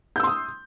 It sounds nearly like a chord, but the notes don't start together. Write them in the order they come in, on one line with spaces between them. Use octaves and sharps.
G6 E6 C6 D#6